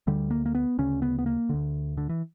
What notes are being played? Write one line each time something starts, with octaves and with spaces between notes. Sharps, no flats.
D2 D3 G3
A#3
A#3
B3
D2 C#3 C#4
B3
B3
A#3
D2 D3
D3
E3